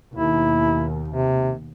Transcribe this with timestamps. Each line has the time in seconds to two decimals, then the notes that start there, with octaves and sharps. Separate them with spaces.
0.15 D#2 B2 D#3 E4
1.08 C3